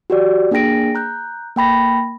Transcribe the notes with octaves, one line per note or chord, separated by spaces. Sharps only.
F#4 G4 D5
A#3 D4 G#4 G5 A#6 D7
A#5 F#6 G6
A#3 G5 B5 A#6